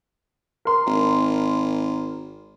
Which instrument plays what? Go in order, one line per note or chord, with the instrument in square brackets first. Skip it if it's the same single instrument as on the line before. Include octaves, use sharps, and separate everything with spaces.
[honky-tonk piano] A#4 C6
[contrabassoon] G#1